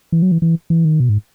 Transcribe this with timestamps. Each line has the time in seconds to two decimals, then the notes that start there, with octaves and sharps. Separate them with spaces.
0.12 E3
0.22 F#3
0.32 E3
0.42 E3
0.70 E3
0.85 D#3
1.00 B2
1.09 G#2